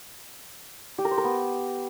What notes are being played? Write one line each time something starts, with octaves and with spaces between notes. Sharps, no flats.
G4
A#4
C5
A#4
B3